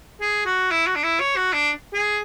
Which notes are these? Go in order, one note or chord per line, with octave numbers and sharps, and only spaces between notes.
G#4
F#4
E4
F#4
D4
E4
C#5
F#4
D4
G#4